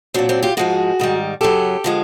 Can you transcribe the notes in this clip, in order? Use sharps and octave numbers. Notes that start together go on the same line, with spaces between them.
A#2 F#3 C4 D4
C4 D4
F4 G4
G#2 F3 G#3 F#4 G#4
G#2 D#3 G3
F#2 C#3 F#3 G4 A4
D3 F3 G#3